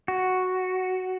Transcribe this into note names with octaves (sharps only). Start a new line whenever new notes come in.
F#4